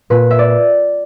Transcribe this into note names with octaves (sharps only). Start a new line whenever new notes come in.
A#2 B4
E5
D5